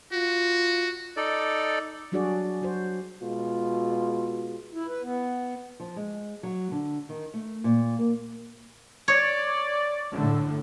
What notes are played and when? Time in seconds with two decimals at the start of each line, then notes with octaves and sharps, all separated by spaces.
0.13 F4 F#4
1.17 D#4 A4 D5
2.12 F#3 G3 D4 F#4 G#4 D5
2.62 F#3 F#4 C5
3.23 B2 G#3 F4
4.74 E4
4.87 B4
5.03 B3
5.80 F3
5.96 G#3
6.43 F#3
6.71 D3
7.09 D#3
7.34 A3
7.64 A#2
7.99 A#3
9.08 C#5 D5
10.11 A2 D3